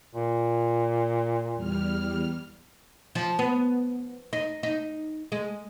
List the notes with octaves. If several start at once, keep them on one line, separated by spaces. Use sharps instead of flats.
A#2
E2 G3 F6
F3
B3
D#4
D#4
G#3